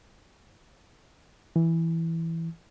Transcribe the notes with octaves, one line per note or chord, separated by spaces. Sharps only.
E3